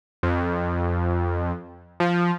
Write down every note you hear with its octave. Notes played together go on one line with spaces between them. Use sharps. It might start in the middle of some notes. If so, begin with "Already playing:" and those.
F2
F3